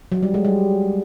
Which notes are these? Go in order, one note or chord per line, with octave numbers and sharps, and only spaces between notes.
F#3
G3
G#3
G3